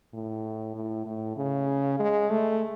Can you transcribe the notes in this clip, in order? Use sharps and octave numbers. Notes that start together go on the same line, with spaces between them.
A2
A2
A2
C#3
G#3
A3